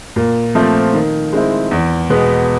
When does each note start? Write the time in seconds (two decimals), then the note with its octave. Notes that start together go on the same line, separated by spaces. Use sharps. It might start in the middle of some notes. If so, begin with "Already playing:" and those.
0.16 A#2
0.55 F3 A3 C4
0.94 D#3
1.32 G#3 C4 E4
1.71 E2
2.10 B2 G#3 B3